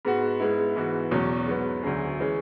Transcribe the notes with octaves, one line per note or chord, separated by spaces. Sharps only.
G#2 G#3 B3 F#4
G#2 G#3 B3 E4
G#2 E3 B3 F#4
E2 B2 F#3 C#4
G#2 F#3 B3
D2 D3 F#3 C#4 G#4
E3 G#3 C#4 G#4